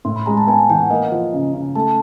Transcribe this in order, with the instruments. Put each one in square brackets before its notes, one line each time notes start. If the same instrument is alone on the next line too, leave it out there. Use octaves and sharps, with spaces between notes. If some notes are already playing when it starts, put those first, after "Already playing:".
[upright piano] A2 [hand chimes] C6
[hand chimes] B5
[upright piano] G#3 [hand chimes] A#5
[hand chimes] A5
[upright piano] B3 [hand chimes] G#5
[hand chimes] G#5
[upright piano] E3 [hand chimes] G5
[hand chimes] F#5
[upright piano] A#3 [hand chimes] D#5
[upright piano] F3
C#3
C#3
[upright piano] A3 [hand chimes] A5